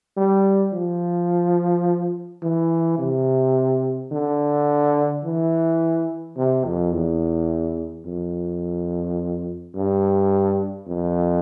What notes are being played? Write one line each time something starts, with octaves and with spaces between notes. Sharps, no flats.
G3
F3
E3
C3
D3
E3
C3
F2
E2
F2
G2
F2